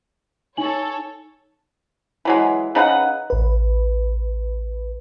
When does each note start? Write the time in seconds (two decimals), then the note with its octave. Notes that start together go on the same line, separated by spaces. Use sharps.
0.57 D#4 A4 C#5 G#5 F#7
2.25 E3 F#3 G#3
2.75 C#3 D#4 B4 F#5
3.30 A1 B4